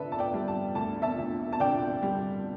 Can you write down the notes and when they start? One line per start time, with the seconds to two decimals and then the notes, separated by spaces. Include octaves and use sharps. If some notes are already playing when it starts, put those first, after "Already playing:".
Already playing: D3 A4 B4 D5 E5
0.12 A5
0.19 D5 G5
0.34 G3
0.48 A5
0.75 D2 A5
1.02 E5 A5
1.18 D2
1.53 A5
1.60 D3 D5 G5
2.03 G3